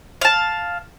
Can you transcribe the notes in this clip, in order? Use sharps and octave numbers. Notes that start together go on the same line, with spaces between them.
F5 A5